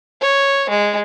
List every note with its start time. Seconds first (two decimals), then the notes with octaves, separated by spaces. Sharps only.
0.21 C#5
0.69 G#3